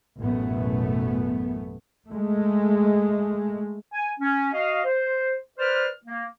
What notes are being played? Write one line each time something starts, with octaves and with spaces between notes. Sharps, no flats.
A1 F#2 B2 A3 B3
G#3 A3
G#5
C#4
F#4 D#5 F5
C5
B4 C5 D5 F6
A#3